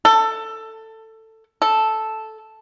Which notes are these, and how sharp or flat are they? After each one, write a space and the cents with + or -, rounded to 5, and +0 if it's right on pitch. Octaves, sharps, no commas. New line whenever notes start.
A4 +15
A4 -5